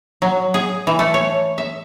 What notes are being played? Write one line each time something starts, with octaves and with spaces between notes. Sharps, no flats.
F#3
G#4
E3
A3
C#5
E5